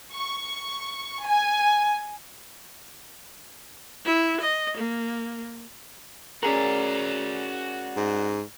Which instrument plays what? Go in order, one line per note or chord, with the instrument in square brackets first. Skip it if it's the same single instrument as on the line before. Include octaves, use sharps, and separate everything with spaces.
[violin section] C#6
G#5
[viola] E4
D#5
A#3
[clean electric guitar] C#4 G#4 A#4 [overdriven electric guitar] F#4 D5
[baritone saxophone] G#2